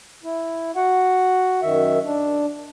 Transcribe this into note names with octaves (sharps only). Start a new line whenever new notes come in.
E4
F#4 F#5
F#2 D#3 E5
D4